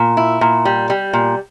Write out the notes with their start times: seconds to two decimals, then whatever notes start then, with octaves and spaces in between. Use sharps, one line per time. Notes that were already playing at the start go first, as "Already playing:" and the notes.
Already playing: A#2
0.17 E4
0.41 A#2
0.65 G3
0.90 G3
1.13 A#2